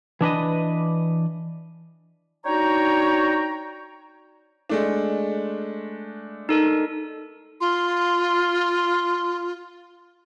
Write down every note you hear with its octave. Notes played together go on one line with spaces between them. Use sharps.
E3 D4 B4 D#5
D4 D#4 F#4 C#5 G5 A#5
G#3 A3 D4
D#4 A4 A#4
F4 C6